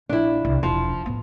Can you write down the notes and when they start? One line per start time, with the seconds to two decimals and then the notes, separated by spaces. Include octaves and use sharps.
0.09 A#1 D4 E4
0.45 C2
0.63 E1 F3 D4
1.06 A2 B3